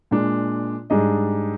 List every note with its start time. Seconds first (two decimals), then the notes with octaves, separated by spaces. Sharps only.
0.11 A#2 G#3 D4
0.90 G#2 G3 D4 G#4 D#5